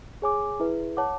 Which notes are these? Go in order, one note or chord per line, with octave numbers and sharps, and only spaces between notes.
G#4 C#5 G#5 D6
E4 G#4 B4 E5
C#5 F#5 A5 D6